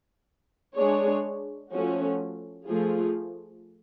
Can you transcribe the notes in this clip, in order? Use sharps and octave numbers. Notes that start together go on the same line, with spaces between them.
G#3 D4 G#4 C#5
F3 A3 C#4 F#4
F3 A3 F4 G#4